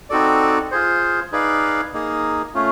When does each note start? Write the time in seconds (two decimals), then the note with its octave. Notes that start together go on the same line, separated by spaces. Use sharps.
0.10 C4 D#4 F#4 A4 D5
0.71 F4 G#4 C5
1.32 D#4 G#4 B4 D5 F5
1.93 A#3 D#4 G#4
2.54 A3 C#4 F4